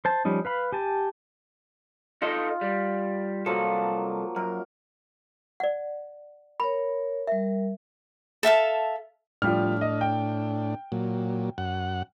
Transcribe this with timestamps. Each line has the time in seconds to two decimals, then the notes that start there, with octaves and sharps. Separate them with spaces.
0.05 C5 A5
0.25 F3 G3 C#4 D#4
0.45 B4 F5 B5
0.72 G4 G#5 A5
2.22 D#4 F4 A4 D#5
2.61 G3
3.46 C2 F3 F#3 A#3 A4
4.36 F#2 A#4
5.60 D5 F#5
6.60 A#4 C#5 B5
7.27 G3 A#4 E5
8.43 A4 E5 F5 A5
9.42 A2 F3 G3 D4 F6
9.81 D#5
10.01 G5
10.92 A#2 F#3
11.58 F#2 F#5